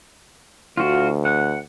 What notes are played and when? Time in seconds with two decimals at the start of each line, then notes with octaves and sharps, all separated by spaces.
0.77 D2 F4 F#4
1.25 F#5